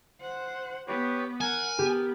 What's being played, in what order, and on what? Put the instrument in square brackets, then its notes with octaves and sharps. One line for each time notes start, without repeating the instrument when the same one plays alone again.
[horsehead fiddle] C5 F#5
[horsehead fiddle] B3 [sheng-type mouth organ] G4 B4 C#5
[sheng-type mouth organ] A#4 [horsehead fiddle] F#5 [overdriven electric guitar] G#5
[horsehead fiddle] B3 [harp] G4